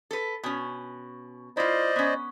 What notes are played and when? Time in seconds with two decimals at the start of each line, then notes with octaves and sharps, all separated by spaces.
0.11 A4 B4
0.43 B2 C#4
1.57 E4 F4 C5 D5 D#5
1.96 B3 C#4